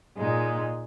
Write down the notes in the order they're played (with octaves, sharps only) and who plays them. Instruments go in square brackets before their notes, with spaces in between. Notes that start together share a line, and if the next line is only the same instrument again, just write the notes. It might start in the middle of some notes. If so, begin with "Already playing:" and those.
[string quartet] A#2 G#3 D#4